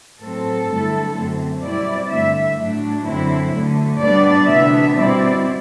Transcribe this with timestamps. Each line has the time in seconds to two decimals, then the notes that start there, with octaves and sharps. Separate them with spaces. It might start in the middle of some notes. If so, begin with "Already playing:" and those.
0.19 A2 F#3 C4 A4
0.67 G2 D3 F#3 A3 E4
1.15 F#2 D3 F#3 A3 C4
1.62 B2 G3 C4 E4 D5
2.10 G2 D3 A3 E5
2.58 A2 F#3 A3 D4
3.05 F#2 D3 F#3 C4 E4
3.53 D2 D3 A3
4.01 B2 G3 B3 D4 D5
4.48 D2 C3 E3 B3 D4 E5
4.96 B2 G3 C4 E4 D5